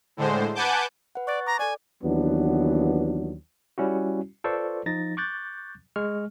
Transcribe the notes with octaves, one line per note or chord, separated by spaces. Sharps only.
A2 D3 G#3 C5
B4 F#5 G#5 A5 D6 G6
B4 F#5
D5 C#6 F#6 A6
A#5 D6
A4 D5 G#5
D#2 E3 F#3 B3 D4
G3 C#4 E4 F#4
F4 A4 B4 C5 D5 C#6
F3 D#4 A6 A#6
C#6 D6 F#6 G6 A6
G#3 C#6 F6